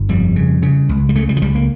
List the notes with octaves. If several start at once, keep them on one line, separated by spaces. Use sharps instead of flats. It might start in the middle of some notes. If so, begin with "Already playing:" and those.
Already playing: G1
F2 G3
C#3
C#3
C#2
G3
C#3 A3
G3
F3
C#2 G3
A#3